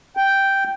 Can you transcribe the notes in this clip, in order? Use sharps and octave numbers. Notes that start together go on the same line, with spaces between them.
G5